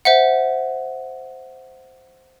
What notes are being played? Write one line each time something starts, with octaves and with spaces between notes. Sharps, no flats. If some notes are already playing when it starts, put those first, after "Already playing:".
C5 E5 F#5